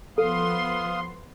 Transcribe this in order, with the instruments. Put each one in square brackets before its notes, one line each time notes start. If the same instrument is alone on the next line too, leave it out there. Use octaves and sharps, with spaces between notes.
[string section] F3 B3 C6 [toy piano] A4 [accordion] F5 D#6